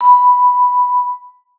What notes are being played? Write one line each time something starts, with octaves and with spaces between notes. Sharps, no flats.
B5